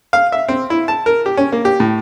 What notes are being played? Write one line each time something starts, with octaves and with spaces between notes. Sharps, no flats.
F5
E5
C4
E4
A5
A#4
G4
C#4
A#3
G4
A2